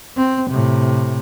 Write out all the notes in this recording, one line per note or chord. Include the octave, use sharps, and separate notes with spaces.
C4
A2 C3